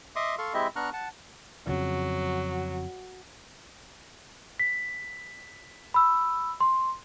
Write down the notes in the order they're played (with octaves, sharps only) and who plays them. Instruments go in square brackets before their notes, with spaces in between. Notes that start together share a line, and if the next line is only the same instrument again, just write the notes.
[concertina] D#5 E5 C6 D6 D#6
A4 F5 C6 C#6
G#3 C4 E4 G4 D#5 E5
B3 D4 A#5 C#6 F6 F#6
F#5 A5
[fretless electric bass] F2 C#3 F3 [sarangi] F#3
[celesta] B6
B5 E6
C6